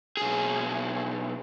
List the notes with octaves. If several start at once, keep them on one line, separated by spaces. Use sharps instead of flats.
B1 G#4